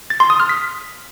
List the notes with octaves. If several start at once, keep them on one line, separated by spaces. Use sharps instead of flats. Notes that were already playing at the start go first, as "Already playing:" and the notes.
A6
C6
D#6
F6
B6